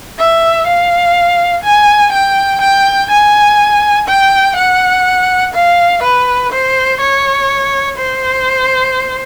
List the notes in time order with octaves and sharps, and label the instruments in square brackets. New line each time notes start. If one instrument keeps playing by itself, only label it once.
[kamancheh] E5
F5
G#5
G5
G5
G#5
G5
F#5
F5
B4
C5
C#5
C5